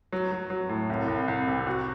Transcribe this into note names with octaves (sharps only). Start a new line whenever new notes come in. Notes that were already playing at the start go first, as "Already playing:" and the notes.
F#3
F#3
F#3
A2
C2
C2
C2
C3
F#4